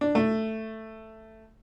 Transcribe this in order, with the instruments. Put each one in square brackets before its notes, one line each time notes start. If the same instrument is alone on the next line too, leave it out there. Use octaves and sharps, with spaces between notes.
[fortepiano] D4
A3